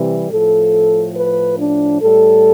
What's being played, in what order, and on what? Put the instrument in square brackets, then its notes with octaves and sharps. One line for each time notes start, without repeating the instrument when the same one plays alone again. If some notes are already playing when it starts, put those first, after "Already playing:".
Already playing: [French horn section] C3 E3 G3
A2 F3 A4
B4
D4
A2 G3 A4